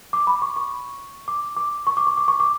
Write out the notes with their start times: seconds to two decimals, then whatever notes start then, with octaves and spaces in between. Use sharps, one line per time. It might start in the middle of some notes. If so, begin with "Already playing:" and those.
0.13 D6
0.27 B5
0.42 C#6
0.56 C#6
1.28 D6
1.57 D6
1.87 C#6
1.97 D6
2.07 C#6
2.17 D6
2.28 C#6
2.40 D6